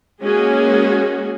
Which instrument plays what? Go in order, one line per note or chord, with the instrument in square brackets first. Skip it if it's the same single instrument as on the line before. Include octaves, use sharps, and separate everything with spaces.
[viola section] G#3 A#3 C#4 F#4 G#4